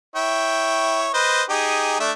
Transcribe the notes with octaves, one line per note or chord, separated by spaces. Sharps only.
E4 C#5 G5
B4 C5 D#5
D#4 G4 G#4
A3 D4 E5